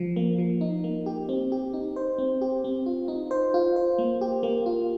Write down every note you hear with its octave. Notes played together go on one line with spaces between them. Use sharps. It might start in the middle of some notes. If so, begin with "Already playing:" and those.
Already playing: F3
A#3
F3
D#4
A#3
G4
C4
G4
D#4
C5
C4
G4
C4
F4
D#4
C5
F4
C5
A#3
G4
A#3
F4